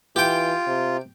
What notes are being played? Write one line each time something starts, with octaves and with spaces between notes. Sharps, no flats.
E3 F4 G4 G5
C3